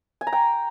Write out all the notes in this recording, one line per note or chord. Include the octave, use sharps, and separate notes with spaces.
G#5
A#5
G5